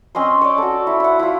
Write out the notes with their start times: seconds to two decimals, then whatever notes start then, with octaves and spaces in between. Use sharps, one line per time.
0.15 C4 C#4 D#5 C6
0.41 C#5 D5
0.58 F#4 A4
0.87 E4
1.00 E4 F#5
1.19 E4 F4